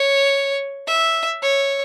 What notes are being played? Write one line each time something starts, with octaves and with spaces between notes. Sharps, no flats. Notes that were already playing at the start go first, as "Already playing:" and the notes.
Already playing: C#5
E5
C#5